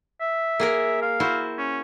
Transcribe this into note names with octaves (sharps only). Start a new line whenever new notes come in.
E5
A#3 G#4 A#4
F5
E4 F#4 C5
C#4